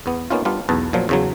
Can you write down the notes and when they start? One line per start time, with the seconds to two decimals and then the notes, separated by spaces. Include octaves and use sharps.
0.06 E2 B3
0.31 A#3 B3 C#4 D#4 F4
0.45 G3 B3 D4 F4
0.69 B1 E2 B4 A5
0.93 A#2 F3 F#3
1.09 E2 C#3 F#3